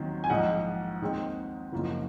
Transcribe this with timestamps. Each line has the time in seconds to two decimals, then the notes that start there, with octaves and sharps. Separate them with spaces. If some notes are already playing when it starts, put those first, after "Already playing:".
Already playing: D#2 D#3 F#3 C4
0.24 G#5
0.30 A#1 G#2 F3 D#5 F#5
1.01 D#2 D#3 G#3 C4
1.72 F#1 F#2 F3 A#3